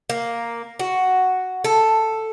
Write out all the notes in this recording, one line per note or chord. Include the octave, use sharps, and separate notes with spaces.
A#3
F#4
A4